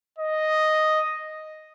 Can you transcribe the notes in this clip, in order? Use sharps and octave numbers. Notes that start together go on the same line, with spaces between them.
D#5